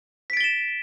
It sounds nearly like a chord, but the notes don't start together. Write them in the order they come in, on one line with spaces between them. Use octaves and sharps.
B6 D7 A6 G7 E7